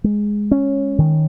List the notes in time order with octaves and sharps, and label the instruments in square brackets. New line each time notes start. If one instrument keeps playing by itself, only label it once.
[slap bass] G#3
C#4
D#3